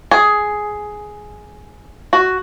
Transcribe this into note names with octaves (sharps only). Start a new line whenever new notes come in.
G#4
F#4